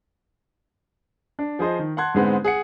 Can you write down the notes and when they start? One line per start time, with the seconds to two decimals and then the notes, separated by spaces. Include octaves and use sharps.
1.39 D4
1.59 F3 G#4 C5 D#5
1.79 D#3
1.97 F#5 A5 C6 F#6 G#6
2.14 G#2 D3 G#3 B3 C4
2.44 G#4 F#5 C#7